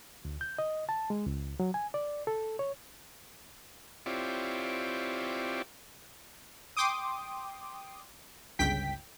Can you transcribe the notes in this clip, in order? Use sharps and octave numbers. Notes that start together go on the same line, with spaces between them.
D2
G6
D#5
A5
G#3
C#2
F#3
G#5
D5
A4
C#5
C4 E4 F4 G4 C#5 D5
G5 C6 D6 D#6
G1 C#2 G5 B6